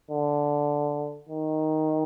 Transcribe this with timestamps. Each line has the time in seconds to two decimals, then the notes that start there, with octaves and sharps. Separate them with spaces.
0.11 D3
1.29 D#3